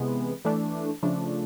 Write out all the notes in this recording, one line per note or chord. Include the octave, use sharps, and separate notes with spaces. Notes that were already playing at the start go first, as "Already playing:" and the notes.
Already playing: C3 E3 G#3 B3
E3 A3 D4
C#3 F3 A3 D4